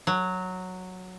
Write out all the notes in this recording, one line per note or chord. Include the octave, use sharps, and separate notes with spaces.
F#3